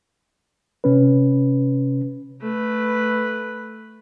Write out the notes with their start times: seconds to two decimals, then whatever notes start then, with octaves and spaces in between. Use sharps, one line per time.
0.84 C3 C#4 B4
2.41 A3 B4